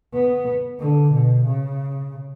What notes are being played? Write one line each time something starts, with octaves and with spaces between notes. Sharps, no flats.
B3
D3
B2
C#3